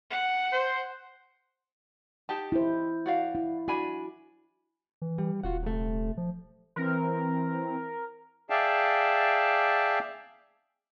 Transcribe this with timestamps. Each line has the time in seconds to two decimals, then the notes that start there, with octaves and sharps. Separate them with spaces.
0.10 F#5
0.52 C5
2.29 D#4 G4 A5
2.52 E4 C5
3.06 F#4 D5 F5
3.35 E4
3.68 D4 F#4 G#5 B5
5.02 E3
5.18 G3
5.43 D#1 F4 F#4 F#5
5.63 C3 A3
6.17 F3
6.76 E3 C4 A#4
8.50 G#4 D5 E5 F5 G5 A5